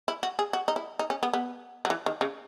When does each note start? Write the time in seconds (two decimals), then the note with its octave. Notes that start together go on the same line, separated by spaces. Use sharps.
0.08 E4
0.23 F#4
0.39 G#4
0.53 F#4
0.68 D#4
0.76 E4
0.99 D#4
1.10 C#4
1.23 B3
1.33 B3
1.85 F#3
1.90 E3
2.06 D#3
2.21 C#3